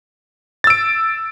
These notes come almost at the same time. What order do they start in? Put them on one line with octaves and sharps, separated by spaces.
A6 E6 D7